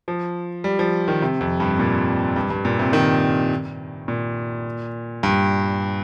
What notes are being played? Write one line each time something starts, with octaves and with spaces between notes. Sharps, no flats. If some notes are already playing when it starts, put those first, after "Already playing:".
F3
G3
F3
D#3
C3
F2
G2
A#2
G2
G2
A#2
C3
D#3
A#2
G2